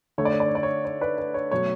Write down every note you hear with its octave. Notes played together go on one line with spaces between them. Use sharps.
D3 A3 C#5
D5
C#5
D5
C#5
D5
C#5
C#5
B4 D5
B4
C#5
B2 F#3 A3 C#5